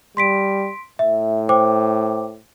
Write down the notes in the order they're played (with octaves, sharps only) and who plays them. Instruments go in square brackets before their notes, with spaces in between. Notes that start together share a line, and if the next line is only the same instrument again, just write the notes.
[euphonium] G3 [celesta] C6 B6 D7
[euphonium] A2 [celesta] E5
[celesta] C5 G5 D6